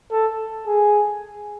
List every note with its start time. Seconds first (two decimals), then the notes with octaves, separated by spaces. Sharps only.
0.11 A4
0.67 G#4